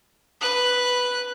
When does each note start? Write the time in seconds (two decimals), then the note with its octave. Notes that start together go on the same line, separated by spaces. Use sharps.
0.41 B4 F#6